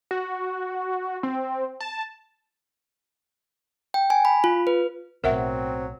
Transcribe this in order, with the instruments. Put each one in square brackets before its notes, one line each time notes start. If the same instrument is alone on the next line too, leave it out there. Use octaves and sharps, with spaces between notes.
[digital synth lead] F#4
C4
A5
[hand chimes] G5
G#5
B5
F4
B4
[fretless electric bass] B1 A2 [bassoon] F#3 [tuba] C4 [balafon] A#4 E5 F#5